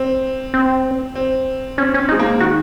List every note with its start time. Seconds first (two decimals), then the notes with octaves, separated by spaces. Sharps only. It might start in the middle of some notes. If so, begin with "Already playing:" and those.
Already playing: C4
0.54 C4
1.15 C4
1.78 C4 C#4
1.94 C#4
1.99 C4
2.09 D#4
2.12 G#3
2.19 A#3
2.40 D#3 F#4